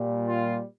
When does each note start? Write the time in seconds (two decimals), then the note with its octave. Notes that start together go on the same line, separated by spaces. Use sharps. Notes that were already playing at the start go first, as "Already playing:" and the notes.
Already playing: A#2 G3
0.26 F4